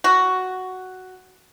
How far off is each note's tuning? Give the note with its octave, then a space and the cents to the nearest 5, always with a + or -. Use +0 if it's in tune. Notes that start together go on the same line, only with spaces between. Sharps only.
F#4 +5